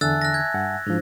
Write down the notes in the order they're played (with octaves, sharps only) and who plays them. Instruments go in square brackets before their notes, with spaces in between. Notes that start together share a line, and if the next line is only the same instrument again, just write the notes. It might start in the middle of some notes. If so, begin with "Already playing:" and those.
[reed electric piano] E2 D3 [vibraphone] E5 G#5 A5 [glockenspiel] E6 F#6 A6
[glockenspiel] F#6 A#6
G#6
[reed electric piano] G2 F#5
[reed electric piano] G#2 F3 [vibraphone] D4 E4 C5